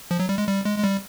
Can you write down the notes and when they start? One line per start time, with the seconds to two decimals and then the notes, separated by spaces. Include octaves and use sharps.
0.11 F3
0.20 F#3
0.29 G3
0.38 G#3
0.47 G3
0.65 G#3
0.78 G#3
0.84 G3